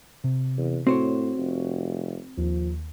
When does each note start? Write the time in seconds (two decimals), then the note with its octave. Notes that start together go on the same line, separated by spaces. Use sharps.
0.24 C3
0.57 E2
0.87 A2 C4 F#4 C5 C#5
1.38 F1
2.37 D#2 F3